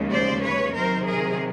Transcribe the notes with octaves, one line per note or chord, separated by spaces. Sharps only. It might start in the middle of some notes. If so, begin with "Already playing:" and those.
Already playing: D#2 C#3 F3 G#3
C5 D5
B4 C#5
C3 D#3 F#3 A#4 C5
G#4 A#4